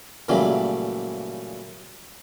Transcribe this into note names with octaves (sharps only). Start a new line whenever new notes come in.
A#2 C#3 E3 F#3 G3 A3